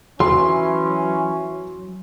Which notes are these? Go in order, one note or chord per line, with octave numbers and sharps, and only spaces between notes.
E3 F#3 C#4 C6